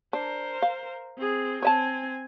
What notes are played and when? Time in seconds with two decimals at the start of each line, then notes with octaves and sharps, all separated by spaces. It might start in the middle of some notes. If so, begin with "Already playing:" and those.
0.13 D4 A#4 C5
0.62 F5
1.17 C4 G#4
1.63 C4 C#5 E5 G#5 A5